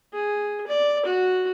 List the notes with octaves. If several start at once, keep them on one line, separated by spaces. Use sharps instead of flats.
G#4
D5
F#4